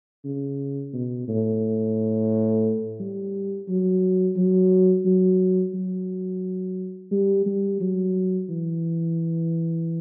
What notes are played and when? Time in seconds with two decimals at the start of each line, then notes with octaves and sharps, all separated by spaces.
0.25 C#3
0.94 B2
1.28 A2
3.00 G3
3.68 F#3
4.37 F#3
5.06 F#3
5.74 F#3
7.12 G3
7.46 G3
7.81 F#3
8.50 E3